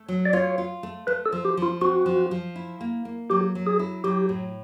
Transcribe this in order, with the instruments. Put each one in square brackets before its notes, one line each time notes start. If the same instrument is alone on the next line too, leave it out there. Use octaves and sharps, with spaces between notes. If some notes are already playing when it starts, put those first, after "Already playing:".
Already playing: [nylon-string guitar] A3
F#3
[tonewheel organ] D5
[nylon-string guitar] F4 [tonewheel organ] C#5
[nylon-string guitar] F4
A3
[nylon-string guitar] A3 [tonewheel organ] B4
[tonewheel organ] A4
[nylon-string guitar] F3
[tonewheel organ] G4
[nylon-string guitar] F3 [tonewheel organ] F4
[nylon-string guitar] C4 [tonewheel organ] F#4
[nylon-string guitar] F3
F3
E4
A#3
A#3
[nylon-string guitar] F#3 [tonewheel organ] G4
[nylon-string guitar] F#3
[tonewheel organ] G#4
[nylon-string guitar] E4
[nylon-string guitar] F#3 [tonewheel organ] G4
[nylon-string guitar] A2